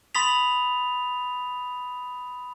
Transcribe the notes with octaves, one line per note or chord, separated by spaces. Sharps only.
B5 C6 D#6 A6 B6 F7